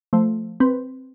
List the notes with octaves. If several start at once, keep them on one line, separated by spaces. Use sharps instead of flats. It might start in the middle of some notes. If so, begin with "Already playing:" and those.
F3 A3 C5
C4 B4